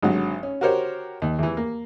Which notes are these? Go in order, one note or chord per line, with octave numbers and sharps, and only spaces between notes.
G#1 D3 F#3
C#4
F#4 G4 A#4 C5 C#5
D#2
E2 E3
A#3